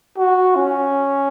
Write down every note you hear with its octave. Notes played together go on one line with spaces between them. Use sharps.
F#4
C#4